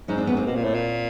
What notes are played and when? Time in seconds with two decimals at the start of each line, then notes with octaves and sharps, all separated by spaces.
0.08 G#2 C#4 D#4
0.18 C4 D4
0.27 B3 C#4
0.37 A#3 C4
0.47 B2
0.56 A#2
0.64 A2
0.74 A#2